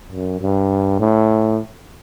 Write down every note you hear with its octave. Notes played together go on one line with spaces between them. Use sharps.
F#2
G2
A2